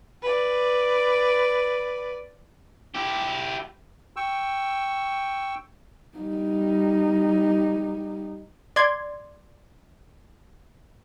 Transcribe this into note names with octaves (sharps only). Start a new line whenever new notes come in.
B4 D5
E4 G4
G5 C#6 E6
G3 D#4
D5 C6 G#6